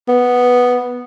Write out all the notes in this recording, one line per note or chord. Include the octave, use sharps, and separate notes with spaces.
B3